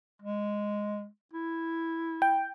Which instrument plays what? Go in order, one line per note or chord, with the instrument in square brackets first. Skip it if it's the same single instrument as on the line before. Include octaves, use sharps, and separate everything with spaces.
[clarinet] G#3
E4
[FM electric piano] G5